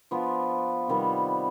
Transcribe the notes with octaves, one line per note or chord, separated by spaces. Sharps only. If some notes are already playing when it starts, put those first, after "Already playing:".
F3 B3 D4 F4
C3 D#3 G3 B3